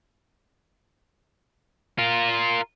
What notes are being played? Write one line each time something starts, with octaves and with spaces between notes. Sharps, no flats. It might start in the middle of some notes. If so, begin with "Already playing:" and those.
F4 A#4